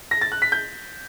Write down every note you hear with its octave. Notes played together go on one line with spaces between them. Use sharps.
A#6
A6
F#6
B6
G6